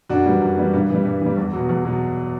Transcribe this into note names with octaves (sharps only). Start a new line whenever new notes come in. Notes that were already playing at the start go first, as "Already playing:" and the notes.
F#2 D4 F#4
E3 G3
F#2
E3 G3
G2
E3 G3
G2
E3 G3
E2
B2 F#3
E2
B2 F#3